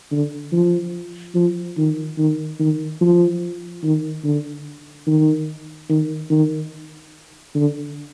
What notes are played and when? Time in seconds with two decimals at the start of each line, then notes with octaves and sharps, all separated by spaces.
0.12 D3
0.52 F3
1.35 F3
1.77 D#3
2.18 D#3
2.60 D#3
3.01 F3
3.84 D#3
4.24 D3
5.07 D#3
5.89 D#3
6.31 D#3
7.55 D3